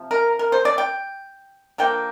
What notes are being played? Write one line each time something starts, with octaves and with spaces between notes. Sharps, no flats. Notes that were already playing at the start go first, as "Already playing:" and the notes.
Already playing: C3 F3
A#4
A#4
C5
D5
G5
D3 F3 A#3 G5